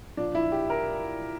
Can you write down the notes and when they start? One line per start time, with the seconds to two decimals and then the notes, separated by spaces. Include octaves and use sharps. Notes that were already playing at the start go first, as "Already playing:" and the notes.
0.17 A#2 F3 D4
0.35 E4
0.52 G4
0.70 A#4